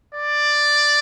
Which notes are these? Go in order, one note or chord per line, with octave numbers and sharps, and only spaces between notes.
D5